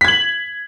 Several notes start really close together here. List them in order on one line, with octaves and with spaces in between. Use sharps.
B6 G#6 F#7